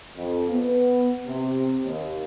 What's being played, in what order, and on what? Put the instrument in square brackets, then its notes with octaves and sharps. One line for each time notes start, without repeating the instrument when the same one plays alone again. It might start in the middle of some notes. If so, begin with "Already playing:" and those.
[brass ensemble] F2
B3
C3
D#2